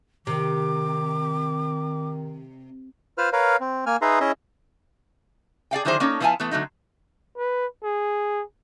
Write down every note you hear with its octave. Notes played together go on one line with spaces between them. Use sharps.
C3 D#3 D6
F4 B4 C5 F6
A#4 B4 C#5 F5
C4
A#3 G#5 F6
D#4 G#4 B4 E5 A#5 C6
C#4 E4 G#4 D#5 E5
G#4 D5 F5 G5
D3 D#3 F#3 E4 G#4 C5
A#3 C#4 D#4 A4 C#5
F3 B3 E4 F5 G#5 A5
E3 A3 B3
D3 F#3 A3 D#4
B4
G#4